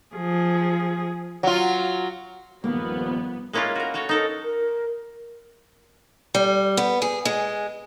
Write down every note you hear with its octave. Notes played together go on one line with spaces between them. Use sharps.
F3 G#4
F#3 F4
D#1 G2 D#3 F3 A#3 B3
G#3 A#3 C#4 E4 F4
F#4 A#4
F#4 A4 C#5
D#4 A4 A#4
A#4
G3
B3
G#4
G#3